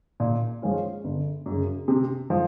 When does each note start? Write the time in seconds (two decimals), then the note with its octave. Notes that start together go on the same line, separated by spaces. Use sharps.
0.20 A#2
0.62 F3 G#3 C#4 F4
1.04 G1
1.46 F#2 C#3
1.88 C3
2.30 F3